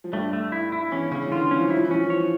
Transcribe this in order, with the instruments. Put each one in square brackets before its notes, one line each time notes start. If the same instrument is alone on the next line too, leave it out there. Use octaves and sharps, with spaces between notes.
[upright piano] F3
[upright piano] G2 G3 [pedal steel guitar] A3
[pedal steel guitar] A3
E4
E4
[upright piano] E2 E3 [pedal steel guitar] C#4
[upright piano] C#3 [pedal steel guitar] C#4
[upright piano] E3
[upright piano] D3 [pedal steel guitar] F4
[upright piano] E3 [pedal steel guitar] C#4
[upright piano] F3
[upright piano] E3 [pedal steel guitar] E4
[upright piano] F3
E3
[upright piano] F3 [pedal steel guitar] C#4
[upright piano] E3
[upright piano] F3 [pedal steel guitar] C#5
[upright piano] E3